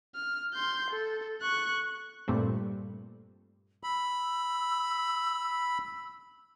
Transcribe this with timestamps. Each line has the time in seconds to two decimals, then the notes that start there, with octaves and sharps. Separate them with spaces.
0.14 F6
0.54 C6 G6
0.90 A4
1.42 C#6 F#6
2.28 G2 A#2 G3 A3 C4
3.83 B5 E6